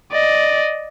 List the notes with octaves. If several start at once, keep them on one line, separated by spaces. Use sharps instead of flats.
D5 D#5